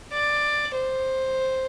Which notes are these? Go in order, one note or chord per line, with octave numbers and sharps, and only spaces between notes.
D5
C5